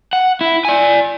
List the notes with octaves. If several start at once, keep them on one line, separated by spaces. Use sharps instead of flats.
F#5
E4
D5 G#5